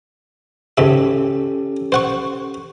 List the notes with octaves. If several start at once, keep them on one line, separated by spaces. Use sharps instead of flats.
C#2 G#2 C#4 G4 A4 E5
C5 F#5 C#6